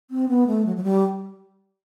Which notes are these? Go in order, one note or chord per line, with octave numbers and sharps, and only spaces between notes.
C4
B3
A3
F#3
F#3
G3